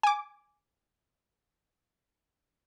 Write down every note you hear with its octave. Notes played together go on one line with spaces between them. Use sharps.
G#5 D6